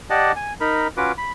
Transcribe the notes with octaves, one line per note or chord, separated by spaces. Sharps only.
G4 D5 D#5 F#5 A5
G#5
D#4 A#4 B5
C#4 F4 F#4 B4 D6
B5